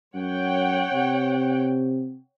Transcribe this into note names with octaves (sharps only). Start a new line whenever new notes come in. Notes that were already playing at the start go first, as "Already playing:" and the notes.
F#2 C#5 F#5 G5
C3